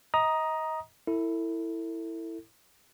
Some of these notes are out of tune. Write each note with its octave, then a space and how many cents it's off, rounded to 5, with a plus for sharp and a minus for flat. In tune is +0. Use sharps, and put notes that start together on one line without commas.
D#5 +30 A#5 +15 D#6 +0
E4 +0 A4 +35